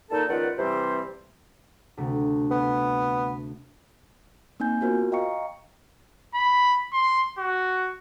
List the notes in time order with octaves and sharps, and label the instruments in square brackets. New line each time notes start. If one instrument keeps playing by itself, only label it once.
[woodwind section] A#2 D#4 A4 A5
C#2 D#3 F4 B4 D5 F#5
C3 E3 G3 C4 G4 C5
[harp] D2 C3 A3
[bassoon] B3
[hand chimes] A#3 C4 D#4 G#5 G6
B3 F4 F#4 A#4 C5
D#5 F5 G5 A#5 C#6 C#7
[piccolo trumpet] B5
C6
F#4